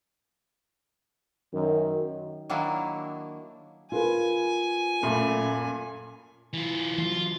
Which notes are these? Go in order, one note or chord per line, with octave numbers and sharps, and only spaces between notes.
F#2 D#3
D#3 F#3 A#3 D4 E4
F4 A#4 B4 G#5
F#2 A#2 A3 B5
E3 F4
E3 F#3 F4